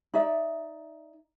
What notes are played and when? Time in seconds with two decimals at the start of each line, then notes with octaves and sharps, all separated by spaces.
0.14 D#4 D5 E5